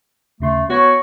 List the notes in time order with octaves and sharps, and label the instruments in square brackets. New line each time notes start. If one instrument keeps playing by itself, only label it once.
[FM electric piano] D#2 C#3 C6 [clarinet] A3
[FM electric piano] B3 [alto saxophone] F#4 [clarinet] C#5 [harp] C#6 A#6